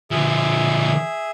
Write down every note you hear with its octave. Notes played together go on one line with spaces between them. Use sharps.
D3 F3 G#4 E5